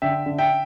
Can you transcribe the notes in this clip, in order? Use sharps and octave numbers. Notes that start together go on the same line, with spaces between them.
D3 E5 G5
D3
E5 G5